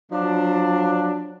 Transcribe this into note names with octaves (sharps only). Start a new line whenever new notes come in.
F3 F#3 D4